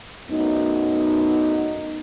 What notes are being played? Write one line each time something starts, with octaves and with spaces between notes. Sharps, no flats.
F#2 A3 B3 D#4